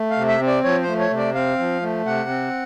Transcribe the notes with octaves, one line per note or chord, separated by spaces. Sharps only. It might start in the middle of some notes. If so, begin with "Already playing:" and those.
Already playing: A3
F5
C3
E5
C4
D5
F3 C#5
C5
A3
C#5
C3
D5
C4 F5
F3
A3
C3 F#5
C4